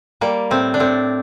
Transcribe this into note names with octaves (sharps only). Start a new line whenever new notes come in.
G3 A#3
A2 C4
D4
A2 C4